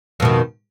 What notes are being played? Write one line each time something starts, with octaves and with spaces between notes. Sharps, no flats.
F2 B2 D#3